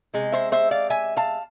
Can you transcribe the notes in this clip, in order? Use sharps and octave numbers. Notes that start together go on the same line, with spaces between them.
C3 G#3
C5 E5
C5 E5
D5 F5
E5 G#5
F5 A5